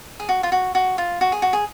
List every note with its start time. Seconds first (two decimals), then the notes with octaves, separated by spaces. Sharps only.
0.20 G#4
0.29 F#4
0.43 F4
0.52 F#4
0.75 F#4
0.98 F4
1.21 F#4
1.32 G#4
1.42 F#4
1.53 G#4